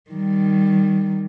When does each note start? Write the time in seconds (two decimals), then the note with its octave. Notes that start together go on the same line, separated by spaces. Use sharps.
0.10 D#3 G3